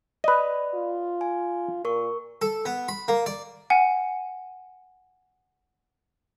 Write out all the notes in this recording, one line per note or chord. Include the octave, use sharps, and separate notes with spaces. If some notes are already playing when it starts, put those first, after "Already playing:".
B4 D5 D#5 B5
F4
G#5
A#2 A#4 C#6
A4
B3
B5
A#3
D5
F#5 G#5